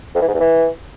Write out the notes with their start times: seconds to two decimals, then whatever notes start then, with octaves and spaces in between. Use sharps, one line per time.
0.15 F2
0.21 E3
0.28 G#2
0.34 E2
0.40 E3